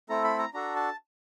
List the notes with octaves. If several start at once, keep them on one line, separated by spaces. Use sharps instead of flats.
A3 C4 E4 A4 A#5
B5
A#5
D4 F#4 A4 A#5
A5